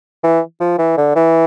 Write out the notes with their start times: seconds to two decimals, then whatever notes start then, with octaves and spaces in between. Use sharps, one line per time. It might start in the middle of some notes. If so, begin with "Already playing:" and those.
0.24 E3
0.60 F3
0.78 E3
0.97 D3
1.16 E3